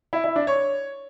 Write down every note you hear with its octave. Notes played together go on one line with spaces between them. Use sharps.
E4
E4
D4
C#5